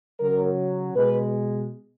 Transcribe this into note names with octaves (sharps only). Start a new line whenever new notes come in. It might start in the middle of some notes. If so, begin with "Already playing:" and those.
C#3 F#3 A#4
B2 G#3 B4